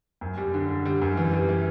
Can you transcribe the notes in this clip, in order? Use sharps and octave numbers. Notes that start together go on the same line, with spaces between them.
F#2
G3
D3
D3
G3
F#2
E3
G3
E3